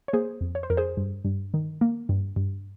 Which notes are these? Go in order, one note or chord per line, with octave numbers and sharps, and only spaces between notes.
C#5
A#3 G#4 C5
F2
C#5
C5
F2 A#4
G#4 C5
G2
G2
D#3
A#3
G2
G2